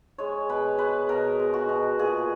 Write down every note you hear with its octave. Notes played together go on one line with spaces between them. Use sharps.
G#3 C#5
B2 B4
G#3 B4
B2 A#4
G#3
F#4
B2
A#2 G#4